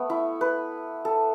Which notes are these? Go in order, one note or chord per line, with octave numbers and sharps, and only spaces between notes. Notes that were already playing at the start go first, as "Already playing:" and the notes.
Already playing: A3 B3
E4
B4
A4